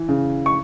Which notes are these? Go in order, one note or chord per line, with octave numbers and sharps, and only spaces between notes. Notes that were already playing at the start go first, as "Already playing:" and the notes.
Already playing: E3
C#3
C#6